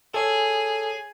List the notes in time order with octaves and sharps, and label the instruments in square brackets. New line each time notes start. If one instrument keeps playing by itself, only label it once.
[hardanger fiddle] G#4 [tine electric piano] A4 C#5